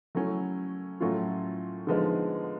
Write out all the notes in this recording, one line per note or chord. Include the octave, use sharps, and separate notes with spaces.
F#3 A3 C#4 E4
A2 F#3 A3 C#4 F4
D3 F3 G#3 B3 D#4